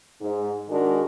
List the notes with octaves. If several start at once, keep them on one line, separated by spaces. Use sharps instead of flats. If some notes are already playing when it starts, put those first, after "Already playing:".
G#2
D#3 G#3 D4 F#4 G#4 A#4